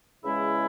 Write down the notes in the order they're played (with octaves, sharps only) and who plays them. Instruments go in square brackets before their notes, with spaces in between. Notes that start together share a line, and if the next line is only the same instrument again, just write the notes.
[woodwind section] E2 C#3 G#3 C#4 E4